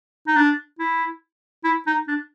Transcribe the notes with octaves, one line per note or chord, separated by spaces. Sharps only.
D#4
D4
E4
E4
D#4
D4